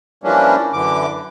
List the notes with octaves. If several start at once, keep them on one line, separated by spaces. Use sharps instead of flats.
E3 F3 G3 A#3 C#4 D4
F#2 D3 E3 D6